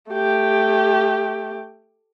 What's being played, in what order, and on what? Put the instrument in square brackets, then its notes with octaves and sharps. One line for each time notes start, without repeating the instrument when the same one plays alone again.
[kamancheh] A3 G4